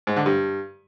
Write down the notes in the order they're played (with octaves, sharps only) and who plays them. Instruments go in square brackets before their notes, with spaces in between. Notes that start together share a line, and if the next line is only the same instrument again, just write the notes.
[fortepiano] G#2
D3
G2